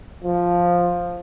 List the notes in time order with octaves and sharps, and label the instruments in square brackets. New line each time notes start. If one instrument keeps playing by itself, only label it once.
[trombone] F3